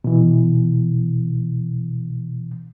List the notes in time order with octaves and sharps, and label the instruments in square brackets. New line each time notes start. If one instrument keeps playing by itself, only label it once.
[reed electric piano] B2 E3